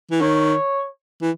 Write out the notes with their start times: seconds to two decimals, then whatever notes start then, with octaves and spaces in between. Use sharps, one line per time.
0.11 E3
0.21 D#3 C#5
1.22 E3